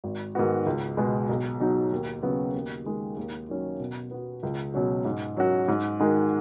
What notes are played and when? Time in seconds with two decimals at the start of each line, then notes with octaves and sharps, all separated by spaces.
0.04 G#1
0.35 G#2 D#3 B3 F#4
0.66 C#2
0.97 B2 G#3 B3
1.29 B1
1.60 B2 F#3 D#4 F#4
1.92 D#2
2.22 C#3 F#3 B3 F#4
2.54 D#2
2.85 D#3 G#3
3.16 D#2
3.49 D#3 F#3 C#4
3.80 B2
4.11 B3 F#4
4.43 C#2
4.74 B2 F#3 C#4 F#4
5.05 G#2
5.37 F#3 C#4 F#4
5.68 G#2
6.00 D#3 G#3 D#4 F#4